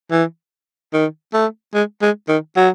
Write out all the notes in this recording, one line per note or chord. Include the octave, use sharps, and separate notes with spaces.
E3
D#3
A3
G#3
G#3
D#3
F#3